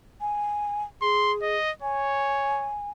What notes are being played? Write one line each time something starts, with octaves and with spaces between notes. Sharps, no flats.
G#5
G#4 C6
D#5
C#5 G#5